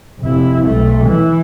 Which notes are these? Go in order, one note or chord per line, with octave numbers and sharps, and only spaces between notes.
F1 E4
B1 A3
E3 E4